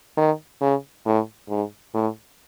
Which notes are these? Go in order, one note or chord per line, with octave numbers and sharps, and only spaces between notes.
D#3
C#3
A2
G#2
A2